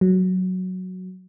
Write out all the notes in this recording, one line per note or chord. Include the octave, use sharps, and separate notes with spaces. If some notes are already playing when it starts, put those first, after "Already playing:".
F#3